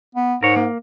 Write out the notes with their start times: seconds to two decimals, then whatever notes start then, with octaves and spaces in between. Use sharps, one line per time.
0.15 B3
0.43 G#2 A#4 C#5
0.56 A#3